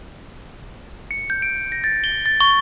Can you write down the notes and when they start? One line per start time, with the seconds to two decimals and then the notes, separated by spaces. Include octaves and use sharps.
1.11 C#7
1.30 G6
1.42 D7
1.72 A#6
1.84 A6
2.04 G7
2.26 A6
2.40 C#6